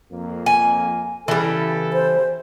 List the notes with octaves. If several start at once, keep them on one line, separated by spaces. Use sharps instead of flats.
F2 A#3
G#5
C#3 E3 G3 B3 A4
C5